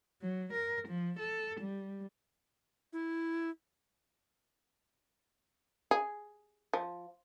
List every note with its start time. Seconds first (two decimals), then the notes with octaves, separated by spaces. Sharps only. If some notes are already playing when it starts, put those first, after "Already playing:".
0.22 F#3
0.53 A#4
0.88 F3
1.19 A4
1.60 G3
2.93 E4
5.91 G#4
6.74 F3